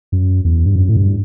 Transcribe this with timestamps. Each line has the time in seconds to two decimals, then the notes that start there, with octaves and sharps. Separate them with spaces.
0.12 F#2
0.45 E2
0.65 G2
0.76 F#2
0.89 A2
0.96 G2